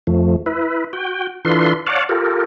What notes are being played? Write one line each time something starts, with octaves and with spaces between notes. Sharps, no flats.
F2 F3 A3
E4 B4
F#4 G5
E3 D4 F4 A4 B4 C6
C#5 D5 F5 F#5 A5
F4 G4 A4 A#4